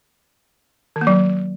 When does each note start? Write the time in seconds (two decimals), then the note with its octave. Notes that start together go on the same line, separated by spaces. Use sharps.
0.96 D#3
1.01 A#3
1.07 F#3